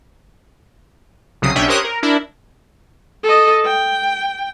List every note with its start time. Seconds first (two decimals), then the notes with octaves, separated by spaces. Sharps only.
1.42 C2 C#3 F#3 D#6 C7
1.56 B1 C#4 D4 E5 G5
1.68 G4 A#4 C5 C#5 D#6 F#6
1.85 A#4
2.02 D4 E4 A#4
3.24 A4 D#5
3.65 G5